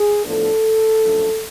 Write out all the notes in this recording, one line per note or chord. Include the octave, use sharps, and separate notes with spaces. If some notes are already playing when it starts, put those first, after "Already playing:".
Already playing: G#4
A2 F3 B3 D4 A4
F#2 F3 A3 D4